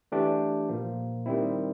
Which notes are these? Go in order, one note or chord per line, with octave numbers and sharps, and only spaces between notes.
E3 A3 D4 G4
A#2 F3 A#3
D#3 G3 C4 E4